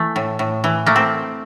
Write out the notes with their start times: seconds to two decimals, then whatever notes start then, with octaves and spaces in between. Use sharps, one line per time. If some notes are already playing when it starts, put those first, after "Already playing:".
Already playing: E3 A3
0.16 A2
0.39 A2
0.64 E3
0.86 A3 A#3
0.96 C4